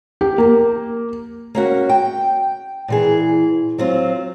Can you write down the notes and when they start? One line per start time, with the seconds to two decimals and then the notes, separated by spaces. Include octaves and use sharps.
0.21 G4
0.38 A#3
1.55 A#3 C#4 F#4
1.89 G5
2.88 A#2 E3 G#4
3.78 F#3 C4 F4